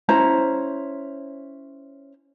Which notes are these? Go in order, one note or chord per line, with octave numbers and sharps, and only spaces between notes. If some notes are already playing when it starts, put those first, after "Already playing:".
C#4 E4 C5 A#5